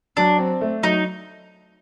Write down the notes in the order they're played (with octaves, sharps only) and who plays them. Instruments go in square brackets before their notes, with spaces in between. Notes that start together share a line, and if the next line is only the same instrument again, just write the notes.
[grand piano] F#3 [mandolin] D4
[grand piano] C4
A3
[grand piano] F#3 [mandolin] D#4